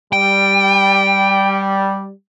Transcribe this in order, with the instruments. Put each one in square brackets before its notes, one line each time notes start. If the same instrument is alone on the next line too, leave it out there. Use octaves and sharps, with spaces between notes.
[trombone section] G3 [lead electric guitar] G5